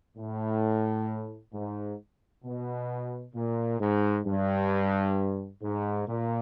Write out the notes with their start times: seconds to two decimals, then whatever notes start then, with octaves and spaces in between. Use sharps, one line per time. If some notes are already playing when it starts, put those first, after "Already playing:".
0.17 A2
1.53 G#2
2.44 B2
3.34 A#2
3.80 G#2
4.26 G2
5.62 G#2
6.08 A#2